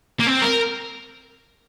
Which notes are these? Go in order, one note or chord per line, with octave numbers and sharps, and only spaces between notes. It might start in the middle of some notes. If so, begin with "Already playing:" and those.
A#3
C4
A#4